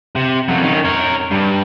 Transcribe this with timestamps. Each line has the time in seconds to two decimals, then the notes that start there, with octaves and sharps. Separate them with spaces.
0.16 C3
0.49 F2 F#3
0.63 D#3 C#4
0.84 A#4 C#5
1.31 G2